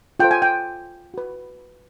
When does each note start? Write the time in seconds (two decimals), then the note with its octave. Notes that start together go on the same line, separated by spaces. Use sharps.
0.19 F4 A4 C5 G5
0.31 G#5
0.42 G5
1.14 F#4 B4